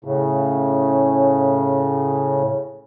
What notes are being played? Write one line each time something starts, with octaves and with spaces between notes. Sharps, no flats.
A2 C#3